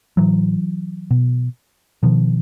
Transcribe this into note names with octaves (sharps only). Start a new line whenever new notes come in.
A2 E3 F#3
B2
B2 D#3 F3